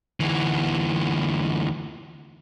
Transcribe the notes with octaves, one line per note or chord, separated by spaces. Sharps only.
D2 E3